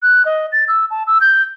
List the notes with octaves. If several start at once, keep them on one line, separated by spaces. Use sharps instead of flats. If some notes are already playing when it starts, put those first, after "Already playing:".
F#6
D#5
A6
E6
A5
E6
G6